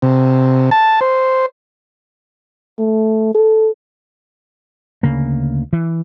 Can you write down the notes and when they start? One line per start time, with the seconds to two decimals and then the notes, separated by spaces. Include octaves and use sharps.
0.02 C3
0.71 A5
1.01 C5
2.79 A3
3.34 A4
5.03 D2 C#3 A#3
5.73 E3